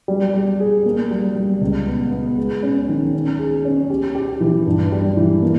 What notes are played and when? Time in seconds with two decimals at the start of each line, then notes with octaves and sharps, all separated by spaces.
0.08 G3
0.34 G3
0.60 G#4
0.86 A#3
1.11 G3
1.35 G3
1.61 C#2
1.87 B3
2.11 B3
2.38 G#3
2.63 C#4
2.89 D#3
3.14 C#4
3.39 G#4
3.65 C#4
3.90 G4
4.15 G4
4.41 E3
4.66 G2
4.92 G3
5.16 E3
5.42 A#3